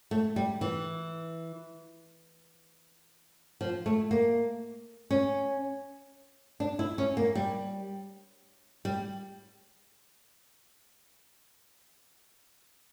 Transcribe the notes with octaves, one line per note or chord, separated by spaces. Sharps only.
A3
G3
E3
F3
A3
A#3
C#4
D4
E4
C#4
A#3
G3
G3